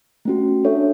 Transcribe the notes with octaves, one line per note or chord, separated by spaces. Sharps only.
A3 C#4 F#4
D4 A4 C#5 E5